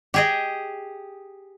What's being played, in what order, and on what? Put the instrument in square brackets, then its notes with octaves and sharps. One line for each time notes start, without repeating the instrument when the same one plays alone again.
[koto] G4 G#4 D#5